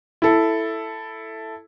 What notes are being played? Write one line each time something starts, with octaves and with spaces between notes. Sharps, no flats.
E4 A4